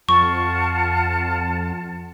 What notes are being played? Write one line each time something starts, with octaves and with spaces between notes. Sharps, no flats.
F2 F4 F#5 A5 C#6